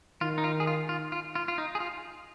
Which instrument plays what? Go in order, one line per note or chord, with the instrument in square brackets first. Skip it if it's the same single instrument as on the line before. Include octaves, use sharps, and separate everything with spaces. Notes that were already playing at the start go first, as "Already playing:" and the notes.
[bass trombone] D#3 [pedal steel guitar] F4
[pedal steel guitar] D#4
F4
G#4
F4
F4
F4
F4
F4
D#4
G#4
F4